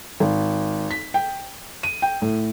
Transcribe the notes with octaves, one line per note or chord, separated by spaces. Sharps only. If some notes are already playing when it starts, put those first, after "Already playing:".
G#1
B6
G5
D#7
G5
A2